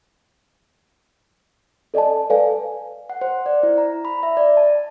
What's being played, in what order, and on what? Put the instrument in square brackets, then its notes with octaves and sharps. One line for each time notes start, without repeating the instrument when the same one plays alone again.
[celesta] A4 D5 D#5 G#5 A5
A4 B4 D5 F5 G#5
[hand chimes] F#5
C5
D5
E4
A#5
B5
E5
D5
A5